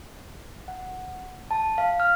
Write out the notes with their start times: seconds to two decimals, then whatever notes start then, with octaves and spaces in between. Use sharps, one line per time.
0.68 F#5
1.51 A5
1.78 F5
2.00 F6